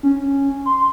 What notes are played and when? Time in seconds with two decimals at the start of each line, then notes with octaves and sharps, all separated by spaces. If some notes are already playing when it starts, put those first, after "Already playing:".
0.03 C#4
0.66 C6